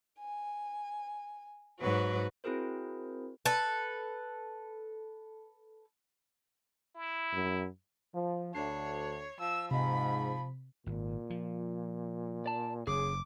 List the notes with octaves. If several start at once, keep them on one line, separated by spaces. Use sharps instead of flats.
G#5
G#2 F#3 F#4 B4
C4 E4 F#4 G#4 A#4 C5
A4 B4
E4
F#2
F3
D2 D4 C#5 C7
F3 E6
G#2 C3 F3 B5
G#1 A#2
F3
D5 A5
F#1 C#3 G#4 D6